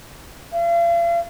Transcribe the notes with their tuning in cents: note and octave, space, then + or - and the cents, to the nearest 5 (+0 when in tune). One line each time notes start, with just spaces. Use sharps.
F5 -40